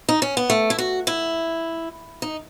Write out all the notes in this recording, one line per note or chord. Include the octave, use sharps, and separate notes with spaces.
D#4
C#4
B3
A3
E4
F#4
E4
D#4